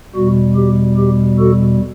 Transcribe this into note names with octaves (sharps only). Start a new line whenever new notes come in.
E2 B2 G3 F#4
G4
G4
F#4 A4